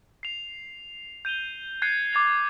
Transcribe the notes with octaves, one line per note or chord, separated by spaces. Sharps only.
C7 F7
G6 D#7 F7 G7
F#6 G#6 A6 C7 C#7 D#7
D6 G#6 A6 F7